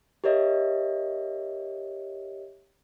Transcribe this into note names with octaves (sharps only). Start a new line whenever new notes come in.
G4 A#4 C#5 D#5 E5